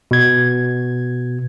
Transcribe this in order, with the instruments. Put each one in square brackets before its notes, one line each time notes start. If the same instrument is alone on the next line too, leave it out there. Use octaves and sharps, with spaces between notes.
[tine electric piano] B2 G#6